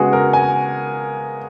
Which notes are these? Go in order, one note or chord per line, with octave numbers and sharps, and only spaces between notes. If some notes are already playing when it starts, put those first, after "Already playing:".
Already playing: C#3 G#3 B3 F#4 G#4
A#4
G#5